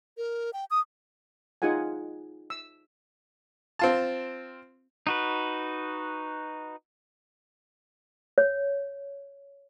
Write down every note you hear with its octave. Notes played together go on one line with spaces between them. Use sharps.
A#4
G5
D#6
D#4 F4 G#4 F#5 G#5
E6
C4 F4 A5
D#4 F#4 B4
C#5